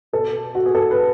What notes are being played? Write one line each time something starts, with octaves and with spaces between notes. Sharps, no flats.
B2 A4
F#4
G#4
A4
B4